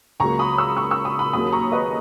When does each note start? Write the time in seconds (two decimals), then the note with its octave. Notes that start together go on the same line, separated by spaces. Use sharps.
0.20 C#2 C#3 F#3 A#3 A#5 C#6
0.39 B5 D#6
0.58 C#6 E6
0.77 C#6 E6
0.91 C#6 E6
1.05 B5 D#6
1.19 B5 D#6
1.33 D#2 C#3 F#3 A#3 B5 D#6
1.52 A#5 C#6
1.72 B4 D#5